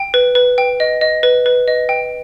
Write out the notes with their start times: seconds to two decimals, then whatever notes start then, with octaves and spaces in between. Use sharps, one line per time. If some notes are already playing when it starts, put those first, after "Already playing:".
Already playing: G5
0.14 B4
0.35 B4
0.58 G5
0.80 D#5
1.01 D#5
1.23 B4
1.46 B4
1.68 D#5
1.89 G5